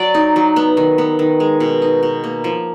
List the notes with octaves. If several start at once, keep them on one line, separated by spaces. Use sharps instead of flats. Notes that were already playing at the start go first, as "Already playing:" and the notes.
Already playing: F#3 D5
D#4
F#3
B3
D#3
B3
D#3
G#3
B2
D#4
B2
A#3
F3